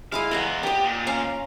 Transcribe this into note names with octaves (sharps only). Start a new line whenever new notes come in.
G#3 E4 D#5 F5
E3 B3 D#5 F5 A#5
D4 G4 D#5
A#2
C#4 F5 A#5